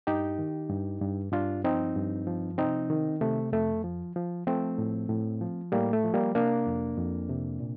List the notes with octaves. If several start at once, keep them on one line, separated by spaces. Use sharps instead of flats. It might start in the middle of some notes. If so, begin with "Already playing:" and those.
G2 D#4 G4
D#3
G2
G2
G2 D4 F4
F3 C4 D#4
G2
F3
C3 C4 D#4
D#3
C3 A3
F2 A3
F3
F3
F3 A3 C4
A2
A2
F3
A2 G3 A#3
A3
F3
G3 A#3
C3 A#3 D4
F2
F2
C3
A#2